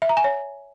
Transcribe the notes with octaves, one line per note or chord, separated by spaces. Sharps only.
E5
A#5
G#5
C#5